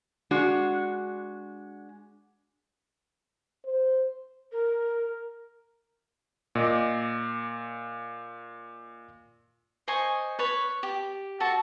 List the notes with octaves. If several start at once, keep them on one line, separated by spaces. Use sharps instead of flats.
G#3 D4 F#4
C5
A#4
A#2 D#5 D6
C5 D#5 G#5 C#6
B4 C#5
G4
F#4 A4 A5